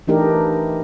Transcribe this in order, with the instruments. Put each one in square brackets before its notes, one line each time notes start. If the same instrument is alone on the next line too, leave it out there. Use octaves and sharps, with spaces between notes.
[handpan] E3 A3 D4 D#4 G4 A#4